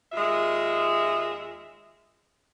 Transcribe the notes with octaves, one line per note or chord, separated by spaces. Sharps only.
D#2 G#3 F4 E5